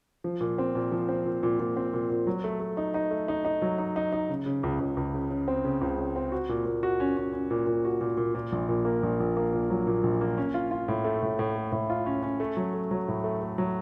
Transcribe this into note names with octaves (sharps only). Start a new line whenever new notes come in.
F3
A#2
C4
A#2
F3
C4
A#2
A#2
A#2
C4
A#2
A#2
F#3
A3
A3
D#4
D#4
A3
D#4
D#4
F#3
D#4
D#4
D#4
C#3
C#3
C#2
C#2
C#2
C#3
C#3
C4
C#3
C#2
C#3
C4
F#4
A#2
A#2
F#4
C#4
C#4
C#4
A#2
A#2
F#4
A#2
A#2
A#2
A#1
A#2
A#3
A#1
A#1
A#3
A#2
F#3
A#2
A#1
A#3
C#4
F4
F4
A2
A3
A2
A2
A3
A2
F4
C#4
C#4
A3
F#3
A3
F#3
A2
A3
A3
F#3